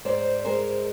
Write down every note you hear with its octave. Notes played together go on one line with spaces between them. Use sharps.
G#2 C5 D5
G#3 A#4 C5